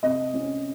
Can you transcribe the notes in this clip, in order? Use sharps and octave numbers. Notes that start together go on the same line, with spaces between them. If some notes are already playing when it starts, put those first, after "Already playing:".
C3 D#5
C#4